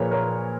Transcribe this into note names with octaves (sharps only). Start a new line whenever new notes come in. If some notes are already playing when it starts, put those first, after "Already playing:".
Already playing: A#2 F3 G#4 A#4 B4 C#5
A#4 C#5